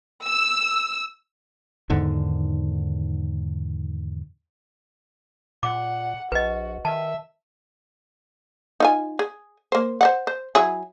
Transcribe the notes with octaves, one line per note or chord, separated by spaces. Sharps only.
E6
E2 G#2 D3 D#3
A#2 F#5 D6
A#1 F#4 B4 D#5
D#3 E5 A5
D#4 F4 G#5
G#4
A#3 C5
C5 D#5 F#5
C5
F#3 E4 G#4